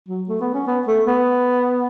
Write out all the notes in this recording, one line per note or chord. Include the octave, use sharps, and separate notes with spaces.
F#3
A3
B3
C#4
B3
A3
B3